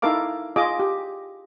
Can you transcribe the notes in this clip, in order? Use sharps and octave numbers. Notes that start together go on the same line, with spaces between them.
D#4 E4 A4 A#4 F5 D6
F4 G#4 D#5 D6
G4